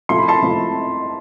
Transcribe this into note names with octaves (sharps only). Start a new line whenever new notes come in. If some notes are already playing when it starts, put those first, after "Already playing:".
C3 F3 A3 E4 C6
B5
A5 C6
C3 F3 A3 E4